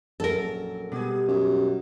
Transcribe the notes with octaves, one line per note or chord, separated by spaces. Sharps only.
A#1 F#3 C#4 A4 A#4
B2 G3 B3 G4 G#4
F#2